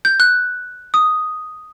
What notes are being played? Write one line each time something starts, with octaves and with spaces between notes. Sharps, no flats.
G6
F#6
D#6